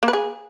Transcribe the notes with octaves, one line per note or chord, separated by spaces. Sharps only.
A#3
B4
G#4